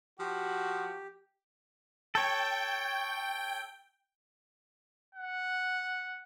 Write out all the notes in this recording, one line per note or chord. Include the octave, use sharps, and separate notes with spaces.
F3 F#4 G4
A4 C#5 G5
F#5